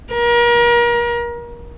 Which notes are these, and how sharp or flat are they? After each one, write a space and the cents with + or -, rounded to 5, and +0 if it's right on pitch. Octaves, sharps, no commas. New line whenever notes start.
A#4 +35